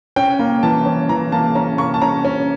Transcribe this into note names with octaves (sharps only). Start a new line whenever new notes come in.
C#4 G5
A#3
E3 A5
C#4
E3 A#5
A#3 A5
C#4 A#5
A#3 C#6
A5
C#4 A#5
C#4